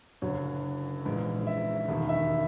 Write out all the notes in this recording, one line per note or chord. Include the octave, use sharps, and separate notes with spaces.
F#1 F#2 D3 F#3 C#5
A#1 G#2 E3
E5
E1 D#2 D#3
E5